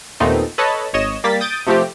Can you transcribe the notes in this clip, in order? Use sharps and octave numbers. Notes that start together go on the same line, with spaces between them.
D#2 A#2 A3 B3 C4 D#4
A4 B4 C#5 D#5 A5 B5
G#1 C#5 D#5 E7
G3 A#3 A6 B6
D#6 G6 A6 D7 D#7
C3 F3 A3 C4 G4